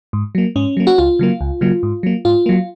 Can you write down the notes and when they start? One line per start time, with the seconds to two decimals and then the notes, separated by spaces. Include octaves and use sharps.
0.13 G#2
0.35 F#3 A#3
0.56 G#2 C#4
0.77 F#3 A#3
0.87 F#4
0.98 C#2 F4
1.19 C#3 F#3 A#3
1.41 C#2
1.61 C#3 F#3 A#3
1.83 G#2
2.03 F#3 A#3
2.25 G#2 F4
2.46 F#3 A#3